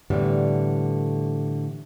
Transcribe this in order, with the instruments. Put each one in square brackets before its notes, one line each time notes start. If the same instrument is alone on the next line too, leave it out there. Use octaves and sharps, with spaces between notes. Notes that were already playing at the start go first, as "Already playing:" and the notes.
[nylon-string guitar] A2 D3 E3 G3 B3